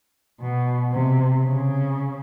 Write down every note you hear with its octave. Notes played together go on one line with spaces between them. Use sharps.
B2
C3
C#3